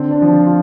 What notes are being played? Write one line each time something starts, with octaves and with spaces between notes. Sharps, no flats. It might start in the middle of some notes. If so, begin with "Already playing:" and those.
Already playing: D3 C4
D4
F3
F4
F4